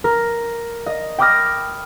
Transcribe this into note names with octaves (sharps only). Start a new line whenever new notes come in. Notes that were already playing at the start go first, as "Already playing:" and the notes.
A#4
D#5
G5 B5 D6 D#6 F6 A#6